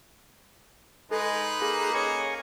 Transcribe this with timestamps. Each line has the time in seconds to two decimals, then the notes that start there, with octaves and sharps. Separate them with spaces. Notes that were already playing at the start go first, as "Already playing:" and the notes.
1.11 G#3 D#4 A4 B4
1.62 A#3 G#4 F#6
1.95 C#4 C#5 D#5 G#5 C#6